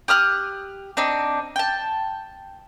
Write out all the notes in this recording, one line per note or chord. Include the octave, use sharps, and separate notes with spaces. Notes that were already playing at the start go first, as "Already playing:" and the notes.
G4 D#6 F6 F#6
C4 D4 D#4
G5 A5